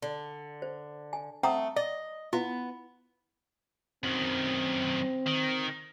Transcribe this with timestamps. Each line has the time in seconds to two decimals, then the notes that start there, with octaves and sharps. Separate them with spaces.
0.02 D3
0.62 C5
1.13 G#5
1.43 A3 C4 F#5 A#5 D#6
1.76 D5 D#5
2.33 B3 E4 F4
4.04 F#2 D#3 C4
5.27 D#3